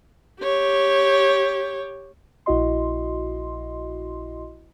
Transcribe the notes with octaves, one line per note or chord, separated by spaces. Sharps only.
G4 C#5
A#1 E4 F#4 D#5 C6